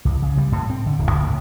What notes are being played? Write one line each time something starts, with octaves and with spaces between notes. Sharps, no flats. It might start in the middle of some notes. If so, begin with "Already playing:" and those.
C2
C#3
G3
A2
C4
D3
D1
C#2
A2